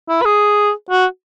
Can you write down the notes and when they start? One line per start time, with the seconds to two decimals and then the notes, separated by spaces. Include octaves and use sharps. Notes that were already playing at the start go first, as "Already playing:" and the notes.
0.09 E4
0.22 B4
0.25 G#4
0.90 F#4